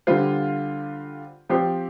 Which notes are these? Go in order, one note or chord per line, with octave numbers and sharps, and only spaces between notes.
D3 G3 F4 C5
F3 C4 G4 C5